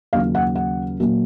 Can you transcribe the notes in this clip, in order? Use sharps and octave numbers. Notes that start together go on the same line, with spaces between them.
D#2 C#3 F#3 C#4 F5
F#5
F#5
A#2 F#3 A#3